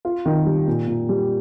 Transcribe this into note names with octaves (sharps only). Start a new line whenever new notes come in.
F4
D#3
G3
A#2
A#2
G3